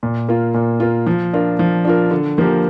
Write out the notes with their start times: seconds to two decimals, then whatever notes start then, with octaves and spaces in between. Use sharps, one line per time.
0.03 A#2
0.29 A#3 F4
0.54 A#2
0.80 A#3 F4
1.07 F3
1.33 D4 F4 A#4
1.59 F3
1.85 D4 F4 A#4
2.11 D3
2.38 F3 A#3 G4 A#4